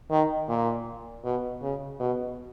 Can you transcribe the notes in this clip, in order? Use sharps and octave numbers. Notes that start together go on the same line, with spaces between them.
D#3
A#2
B2
C#3
B2